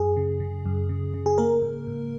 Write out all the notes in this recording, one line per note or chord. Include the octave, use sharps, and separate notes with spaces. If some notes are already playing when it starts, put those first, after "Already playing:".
Already playing: F#2 G#4
C#3
C#3
F#2
C#3
C#3
G#4
A#3 A#4
G#2
G#2